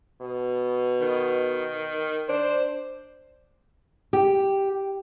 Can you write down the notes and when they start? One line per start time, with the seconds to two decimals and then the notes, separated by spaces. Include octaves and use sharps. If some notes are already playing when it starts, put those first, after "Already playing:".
0.21 B2
1.01 D#3
2.29 D4 C5
4.13 G4